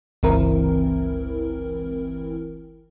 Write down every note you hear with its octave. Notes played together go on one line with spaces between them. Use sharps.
G1 C#2 E3 C4 E4 A#4